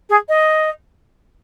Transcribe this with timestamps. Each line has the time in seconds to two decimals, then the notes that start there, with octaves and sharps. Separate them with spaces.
0.09 G#4
0.28 D#5